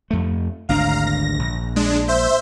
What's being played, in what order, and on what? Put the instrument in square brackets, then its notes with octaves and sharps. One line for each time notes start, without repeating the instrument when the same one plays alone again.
[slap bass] F2 A3
[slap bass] G#1 D2 D4 [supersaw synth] F5 A#5
[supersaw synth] A#6
[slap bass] A#1
[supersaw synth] G#3 D4
C5 E5 G6